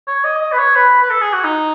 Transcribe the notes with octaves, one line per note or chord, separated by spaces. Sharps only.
C#5
D#5
D#5
B4
C#5
B4
B4
A4
G#4
F#4
D#4